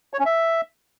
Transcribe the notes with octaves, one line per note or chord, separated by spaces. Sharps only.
C#5
C#4
E5